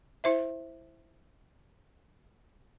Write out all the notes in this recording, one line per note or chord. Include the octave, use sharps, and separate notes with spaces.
E4 C5 E5